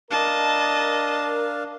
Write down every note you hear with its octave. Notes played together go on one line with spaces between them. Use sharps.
D4 A#4 D#5 F5 A5